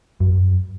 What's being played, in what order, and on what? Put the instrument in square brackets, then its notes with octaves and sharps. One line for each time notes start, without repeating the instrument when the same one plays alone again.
[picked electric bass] F#2